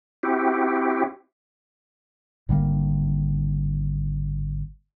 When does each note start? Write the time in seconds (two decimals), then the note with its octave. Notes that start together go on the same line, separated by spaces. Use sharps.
0.23 C4 E4 F#4 G4
2.49 G#1 D3 G3 A#3